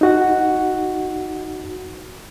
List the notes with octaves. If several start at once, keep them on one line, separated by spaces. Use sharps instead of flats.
D#4 F#4 F#5